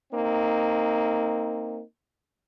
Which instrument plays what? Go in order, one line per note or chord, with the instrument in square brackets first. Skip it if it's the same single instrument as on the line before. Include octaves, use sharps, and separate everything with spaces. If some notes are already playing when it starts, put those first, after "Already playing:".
[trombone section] A#3 C4 D#4